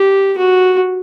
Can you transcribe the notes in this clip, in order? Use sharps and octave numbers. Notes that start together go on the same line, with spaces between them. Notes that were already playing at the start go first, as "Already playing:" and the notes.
Already playing: G4
F#4